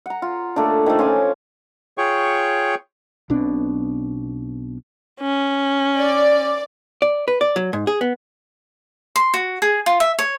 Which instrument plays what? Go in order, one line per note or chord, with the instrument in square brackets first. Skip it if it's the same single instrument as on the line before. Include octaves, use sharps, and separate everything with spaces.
[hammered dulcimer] F#5 A#5
F4
A3 A#3 D4
D#3 F3 A3
C#4 F4 G#5 D6
[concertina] F4 G#4 C#5 G5 C#6
[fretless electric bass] B1 B2 C4 D4
[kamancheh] C#4
[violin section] D5
[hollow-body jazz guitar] D5
B4
D5
F#3
G#2
G#4
B3
[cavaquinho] C6
F#4
G#4
F4
E5
C#5